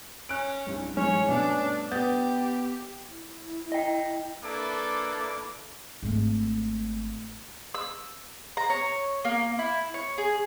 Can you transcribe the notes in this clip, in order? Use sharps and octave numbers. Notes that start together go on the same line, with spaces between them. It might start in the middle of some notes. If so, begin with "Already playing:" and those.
C#4 F#6 D7
C2 G2
G#2 E3 C#4 C#5
G2 B2 A3 D4
B3 G4 D#6 G6 A6
E4
D#5 G5
A#3 D4 E4 A4 B4 D6
G#1 A3
E6
A#5
C#5
A#3
E4
C#5
G#4